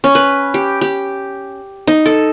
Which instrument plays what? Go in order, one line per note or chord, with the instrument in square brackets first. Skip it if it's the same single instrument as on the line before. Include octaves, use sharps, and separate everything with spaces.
[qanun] C#4
B4
G4
G4
D#4
A4